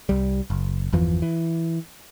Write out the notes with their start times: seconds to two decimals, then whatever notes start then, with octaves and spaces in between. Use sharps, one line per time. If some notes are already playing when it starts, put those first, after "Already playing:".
0.09 C2 G3
0.50 F#1
0.92 G1 E2 E3 F3
1.22 E3